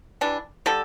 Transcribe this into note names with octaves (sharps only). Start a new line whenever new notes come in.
E3 G3 D4
D3 G3 D4 A4